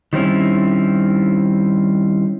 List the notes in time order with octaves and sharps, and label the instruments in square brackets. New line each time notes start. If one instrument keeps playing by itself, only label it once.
[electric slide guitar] D#3 G3 C4 C#4 E4